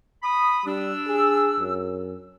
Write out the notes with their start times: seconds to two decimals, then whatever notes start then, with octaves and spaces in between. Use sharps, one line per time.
0.23 B5 D#6
0.66 G3 D4 E6
1.07 G#4
1.59 F#2